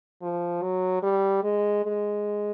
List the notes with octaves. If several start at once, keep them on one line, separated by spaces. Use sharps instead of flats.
F3
F#3
G3
G#3
G#3